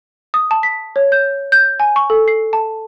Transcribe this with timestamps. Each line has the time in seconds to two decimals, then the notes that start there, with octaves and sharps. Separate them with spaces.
0.34 D#6
0.51 A5
0.63 B6
0.96 C#5
1.12 G6
1.52 G6
1.80 G#5
1.96 C#6
2.10 A4
2.28 C7
2.53 A5